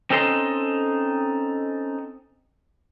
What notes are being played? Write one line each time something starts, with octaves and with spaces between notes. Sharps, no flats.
C4 C#4 D#4 A4 D#5 C6